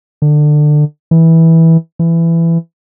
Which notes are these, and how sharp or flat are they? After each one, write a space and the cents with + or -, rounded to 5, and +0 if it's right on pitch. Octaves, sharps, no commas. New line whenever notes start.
D3 +25
E3 -15
E3 +15